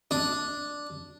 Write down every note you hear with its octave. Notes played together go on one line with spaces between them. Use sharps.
D4